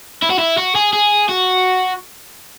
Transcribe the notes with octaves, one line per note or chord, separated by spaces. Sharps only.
E4
F#4
E4
F#4
G#4
G#4
F#4